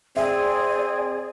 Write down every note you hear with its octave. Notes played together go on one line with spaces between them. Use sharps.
C4 G#4 D5 E5